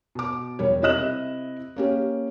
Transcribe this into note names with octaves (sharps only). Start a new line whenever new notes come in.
B2 D6
E1 G3 G4 A#4 C#5
C3 E4 D#5 F#6 E7
A#3 C#4 G4